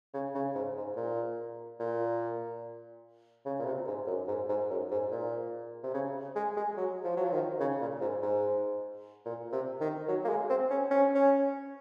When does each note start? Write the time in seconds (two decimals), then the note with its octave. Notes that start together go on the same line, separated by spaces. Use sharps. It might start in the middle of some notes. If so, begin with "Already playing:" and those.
0.14 C#3
0.35 C#3
0.55 G#2
0.76 G#2
0.96 A#2
1.80 A#2
3.46 C#3
3.59 A#2
3.65 C3
3.87 G#2
4.07 F#2
4.28 G#2
4.49 G#2
4.70 F#2
4.91 G#2
5.11 A#2
5.83 C3
5.94 C#3
6.36 G#3
6.57 G#3
6.77 F#3
7.04 F3
7.17 F#3
7.25 F3
7.32 D#3
7.60 C#3
7.81 A#2
8.01 G#2
8.22 G#2
9.26 A#2
9.52 C3
9.80 D#3
10.08 F#3
10.24 A#3
10.29 G#3
10.49 C4
10.70 C#4
10.91 C#4
11.14 C#4